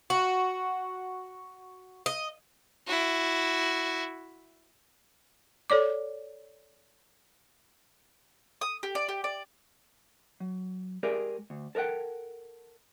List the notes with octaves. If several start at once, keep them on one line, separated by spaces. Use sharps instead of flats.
F#4
D#5
E4 F#4
A4 C#5 D5 D6
D#6
G4
D5
G4
D5
F#3
G#3 G4 G#4 A#4 D5
D2
A4 A#4 D5 F#5 G5